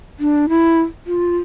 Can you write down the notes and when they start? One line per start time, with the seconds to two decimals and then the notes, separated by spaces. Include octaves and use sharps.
0.19 D4
0.49 E4
1.07 F4